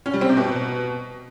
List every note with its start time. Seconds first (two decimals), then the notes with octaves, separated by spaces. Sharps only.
0.06 C#4
0.13 G3
0.21 C4
0.29 C3
0.37 B2